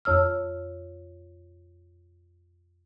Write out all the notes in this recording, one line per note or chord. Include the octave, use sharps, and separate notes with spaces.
F2 C#5 E6 F6